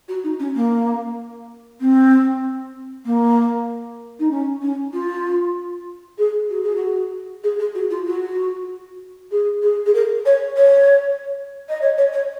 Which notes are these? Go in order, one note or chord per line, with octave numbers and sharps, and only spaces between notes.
F#4
D#4
C#4
A#3
C4
A#3
D#4
C#4
C#4
F4
G#4
F#4
G#4
F#4
G#4
G#4
F#4
F4
F#4
G#4
G#4
G#4
A#4
C#5
C#5
D#5
C#5
C#5
C#5